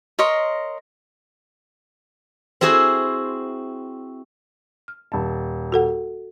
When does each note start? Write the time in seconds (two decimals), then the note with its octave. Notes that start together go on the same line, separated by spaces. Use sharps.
0.19 A#4 C#5 D#5 C6
2.61 C4 E4 F#4 G#4 C5
4.88 F6
5.12 D#1 A5
5.72 F#4 A4 F#5